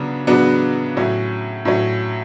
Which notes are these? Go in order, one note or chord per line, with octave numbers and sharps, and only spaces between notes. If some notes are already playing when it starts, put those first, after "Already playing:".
Already playing: C#3 F#3 B3 D4
C#3 F#3 B3 D4
A2 F#3 C#4
A2 F#3 C#4